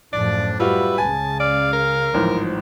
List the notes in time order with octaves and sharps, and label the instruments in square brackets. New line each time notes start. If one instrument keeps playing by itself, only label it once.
[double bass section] F#2 A2 F3 [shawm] D4 [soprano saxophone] D5
[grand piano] G3 F4 F#4 [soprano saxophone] B4 [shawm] E5
[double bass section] C#2 C#3 [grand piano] G#5 [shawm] A5
[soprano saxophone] D5 [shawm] F5
[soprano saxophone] A#4
[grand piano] A1 G#2 [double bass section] F3 F#3